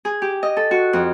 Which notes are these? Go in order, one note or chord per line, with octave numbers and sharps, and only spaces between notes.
G#4
G4
D#5
A4
F#4
F2